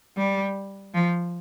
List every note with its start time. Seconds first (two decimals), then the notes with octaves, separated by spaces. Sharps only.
0.17 G3
0.94 F3